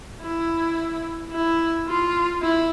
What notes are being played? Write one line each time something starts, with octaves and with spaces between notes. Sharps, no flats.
E4
E4
F4
E4